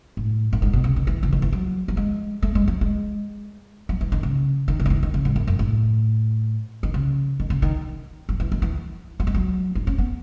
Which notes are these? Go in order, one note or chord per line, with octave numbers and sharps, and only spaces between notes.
A2
A2
G#2
B2
C#3
D#3
E3
C#3
D#3
E3
F#3
F#3
G#3
A3
G#3
F#3
G#3
F#3
E3
D#3
C#3
D#3
C#3
F#3
E3
D#3
C#3
G#2
F#2
F#2
A2
D#3
C#3
D#3
C#3
D#3
F#3
E3
D#3
E3
F#3
G#3
F#3
D#4
C#4
B3